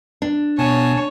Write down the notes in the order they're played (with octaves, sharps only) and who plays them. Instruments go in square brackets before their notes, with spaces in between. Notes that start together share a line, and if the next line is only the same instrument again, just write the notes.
[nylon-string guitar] D4
[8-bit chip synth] B2 B3 [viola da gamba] C#5 [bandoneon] G#5 A5